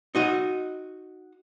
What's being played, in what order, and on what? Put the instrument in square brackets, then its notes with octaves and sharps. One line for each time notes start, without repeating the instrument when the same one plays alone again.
[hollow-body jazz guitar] D#4 F#4 D#5